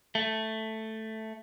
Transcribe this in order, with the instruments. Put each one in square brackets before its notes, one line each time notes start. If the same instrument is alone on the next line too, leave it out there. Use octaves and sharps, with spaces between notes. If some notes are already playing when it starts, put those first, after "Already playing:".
[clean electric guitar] A3